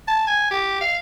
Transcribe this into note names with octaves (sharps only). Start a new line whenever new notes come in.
A5
G#5
G4
F5